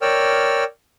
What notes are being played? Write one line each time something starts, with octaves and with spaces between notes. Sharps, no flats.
A#4 C#5 D5 G5 E6 F6